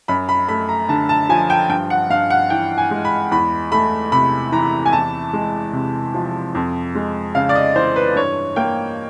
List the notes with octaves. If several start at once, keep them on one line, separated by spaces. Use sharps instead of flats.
F#2 B5
B5
A3 B5
A#5
D3 A5
A5
F3 G#5
G5
G2 G5
F#5
G2 F5
F#5
E3 G5
G#5
G#3
B5
E2 B5
A3 B5
C3 B5
E3 A#5
G#5
E2 A5
G#3
C3
F3
F2
G#3
C#3 F5
D5
D#5
E3 C5
B4
G2 C#5
A#3 G5